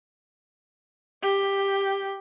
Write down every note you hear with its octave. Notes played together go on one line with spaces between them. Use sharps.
G4